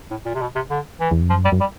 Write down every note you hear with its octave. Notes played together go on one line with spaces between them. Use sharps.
A2
A#2
C3
B2
C3
D3
E3
E2
F2
F#2 F3
G3
F#2
G3